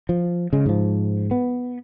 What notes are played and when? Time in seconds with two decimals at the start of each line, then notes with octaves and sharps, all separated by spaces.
0.09 F3
0.53 C#3 G#3
0.66 G#2 F3
1.31 B3